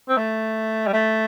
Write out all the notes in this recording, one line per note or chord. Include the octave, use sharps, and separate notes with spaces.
C4
A3
G3
A3